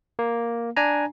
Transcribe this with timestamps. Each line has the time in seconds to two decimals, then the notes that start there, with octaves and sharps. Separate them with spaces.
0.19 A#3
0.77 D4 G#5 A#5